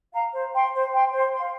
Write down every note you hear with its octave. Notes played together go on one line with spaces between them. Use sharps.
F5 A#5
C5
G5 C6
C5
G5 C6
C5
F5 C6